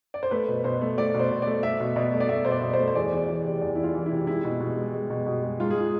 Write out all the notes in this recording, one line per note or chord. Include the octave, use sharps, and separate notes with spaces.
D5
C5
A3 B4
B2
B2 C5
A3
A3 D5
B2
C5
B2
A3 D5
A3 E5
B2
B2 D5
A3
D5
A3 E5
B2 C5
D5
B2
C5
A3
C5
E2 D5
E2
E3 D5
C3
E2 D5
E2 E4
F4
E3
E4
C3
G#3 E4
B2
B2
G#3
G#3
B2
B2
G#3
G#2 F4
G#4
F4